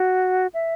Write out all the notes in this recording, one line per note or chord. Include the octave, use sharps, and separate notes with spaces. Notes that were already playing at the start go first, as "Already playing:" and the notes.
Already playing: F#4
E5